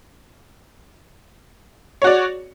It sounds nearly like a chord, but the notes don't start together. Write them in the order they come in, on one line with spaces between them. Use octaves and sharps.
C#5 F#4 D5